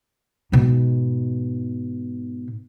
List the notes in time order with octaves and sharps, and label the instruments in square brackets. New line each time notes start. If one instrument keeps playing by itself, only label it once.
[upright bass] G#2 B2